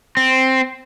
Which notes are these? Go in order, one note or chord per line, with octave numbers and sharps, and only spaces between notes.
C4